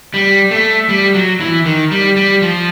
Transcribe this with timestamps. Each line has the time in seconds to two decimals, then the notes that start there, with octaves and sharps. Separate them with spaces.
0.14 G3
0.51 A3
0.89 G3
1.14 F#3
1.40 E3
1.66 D#3
1.91 G3
2.17 G3
2.42 F3